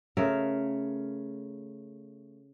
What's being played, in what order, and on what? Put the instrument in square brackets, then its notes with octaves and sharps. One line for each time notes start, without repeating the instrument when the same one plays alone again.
[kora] C#3 A3 A#4 F5